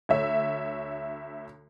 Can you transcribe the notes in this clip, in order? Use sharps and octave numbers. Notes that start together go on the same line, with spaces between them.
D2 C#5 E5